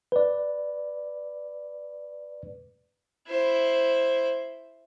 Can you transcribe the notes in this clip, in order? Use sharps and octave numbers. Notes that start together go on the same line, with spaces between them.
B4 D5
E4 C5